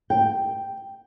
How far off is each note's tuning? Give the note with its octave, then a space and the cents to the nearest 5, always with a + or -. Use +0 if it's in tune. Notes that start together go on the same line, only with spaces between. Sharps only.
G5 +0